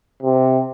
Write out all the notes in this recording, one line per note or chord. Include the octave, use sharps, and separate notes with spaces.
C3